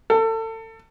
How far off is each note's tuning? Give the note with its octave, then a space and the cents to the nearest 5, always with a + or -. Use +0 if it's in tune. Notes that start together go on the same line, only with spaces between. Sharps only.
A4 +30